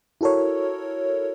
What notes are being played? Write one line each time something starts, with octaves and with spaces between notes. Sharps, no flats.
E4 F#4 A4 A#4 C#5